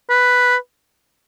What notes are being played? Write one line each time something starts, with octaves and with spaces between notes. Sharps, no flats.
B4